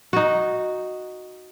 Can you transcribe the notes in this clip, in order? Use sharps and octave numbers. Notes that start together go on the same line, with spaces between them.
D#4 F#4